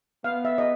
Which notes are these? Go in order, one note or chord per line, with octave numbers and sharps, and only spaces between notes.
B3 F5
E5
D#5